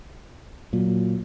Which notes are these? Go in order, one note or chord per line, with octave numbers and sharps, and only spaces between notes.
A#2 F#3